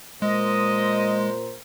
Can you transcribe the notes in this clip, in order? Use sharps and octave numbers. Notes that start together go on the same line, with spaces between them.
A#2 G#3 A#4 C5 D#5